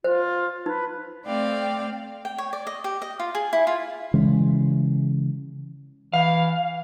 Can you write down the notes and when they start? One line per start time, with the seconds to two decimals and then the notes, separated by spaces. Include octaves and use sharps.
0.04 F4 C5
0.66 D#4 B4
1.25 A3 C4 D5 F5 G5
2.25 G5
2.38 C#5
2.53 D5
2.67 D#5
2.84 G4
3.02 D#5
3.19 F4
3.35 G#4
3.53 E4
3.67 F4
4.14 C#3 E3 G#3
6.13 E3 F5